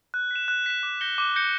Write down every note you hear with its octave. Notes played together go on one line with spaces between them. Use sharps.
F#6
B6 E7
F#6
B6 E7
D6
G6 A#6 C#7 G7
D6
G6 A#6 C#7 G7